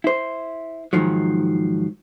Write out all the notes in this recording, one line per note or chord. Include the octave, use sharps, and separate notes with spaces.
E4 C5
G#2 C3 D#3 F3 F#3